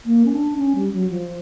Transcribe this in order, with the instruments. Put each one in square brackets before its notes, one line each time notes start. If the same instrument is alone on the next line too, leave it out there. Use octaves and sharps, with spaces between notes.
[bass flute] A#3
C#4
D4
C#4
G3
F#3
F3